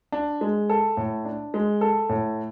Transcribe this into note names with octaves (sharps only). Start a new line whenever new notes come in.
D4
G#3
A4
A2
D4
G#3
A4
A2